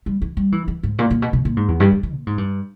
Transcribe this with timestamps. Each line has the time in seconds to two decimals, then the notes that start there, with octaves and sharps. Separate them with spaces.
0.06 G3
0.22 E3
0.37 G3
0.52 E3
0.68 E3
0.83 G#2
0.99 A#2
1.11 A#2
1.22 B2
1.33 B2
1.45 A#2
1.57 G#2
1.68 E2
1.80 G2
1.91 G2
2.03 E3
2.14 A#2
2.27 G#2
2.38 G2